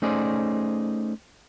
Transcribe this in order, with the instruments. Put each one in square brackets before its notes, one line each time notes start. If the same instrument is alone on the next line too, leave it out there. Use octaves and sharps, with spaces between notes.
[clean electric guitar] A3 C#4 D#4 G#4 C5 D5